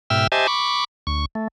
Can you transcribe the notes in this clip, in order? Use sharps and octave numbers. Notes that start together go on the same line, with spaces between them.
G#2 B2 E5 G5 E6 F6
G4 C5 D#5 E5 G#5 A5
B5 C#6 D6
D2 C#6
A3